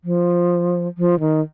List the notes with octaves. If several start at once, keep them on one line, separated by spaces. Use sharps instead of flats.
F3
F3
D#3